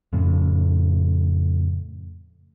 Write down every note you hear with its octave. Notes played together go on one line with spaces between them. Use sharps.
F2 A2 C#3